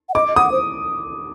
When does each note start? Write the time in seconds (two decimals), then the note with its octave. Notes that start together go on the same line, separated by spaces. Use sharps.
0.09 F#5
0.14 D#5 D6
0.28 D#5
0.36 F#5 D#6
0.52 C5